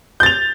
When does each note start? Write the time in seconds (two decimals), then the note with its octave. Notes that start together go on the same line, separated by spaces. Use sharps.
0.20 G6
0.23 A6
0.26 F7